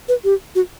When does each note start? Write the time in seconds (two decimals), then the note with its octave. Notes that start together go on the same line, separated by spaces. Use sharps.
0.08 B4
0.24 G4
0.55 F#4